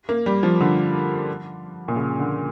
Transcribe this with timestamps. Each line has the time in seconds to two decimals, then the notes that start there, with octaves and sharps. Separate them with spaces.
0.09 A#3
0.26 G3
0.43 F3
0.60 D3
1.88 A#2
1.96 C#3
2.19 D3